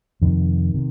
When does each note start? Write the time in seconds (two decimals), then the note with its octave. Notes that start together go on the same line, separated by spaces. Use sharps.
0.22 F2 C3 D#3
0.74 C3